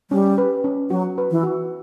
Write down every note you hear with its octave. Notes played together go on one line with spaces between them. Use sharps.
G3 C#4
B4
C#4
F#3 F#4
B4
E3
F#4